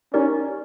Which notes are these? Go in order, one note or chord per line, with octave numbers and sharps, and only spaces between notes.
C#4 D#4 G4 A#4 D5